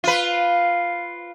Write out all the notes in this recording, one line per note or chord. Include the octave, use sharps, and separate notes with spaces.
F4 B4